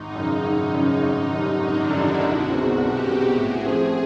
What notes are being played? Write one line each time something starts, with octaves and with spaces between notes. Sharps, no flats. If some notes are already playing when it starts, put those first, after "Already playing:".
Already playing: G#1 D#4
F#2 C#3
G#1
F#2 C#3
G#1 D#4
F#2 D3 G3
G#1 D4
F#2 D3 G3 E4
B1 F#4
B2 G#3 C4
B1 G4
B2 G#3 C4
A2 G#4
F3 A3 C4